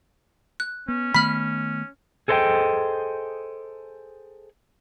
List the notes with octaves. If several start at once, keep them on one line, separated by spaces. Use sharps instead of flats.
F#6
B3 C#4
D#3 A3 B3 B5 F6 B6
G#4 A4 C5 D5 D#5 G5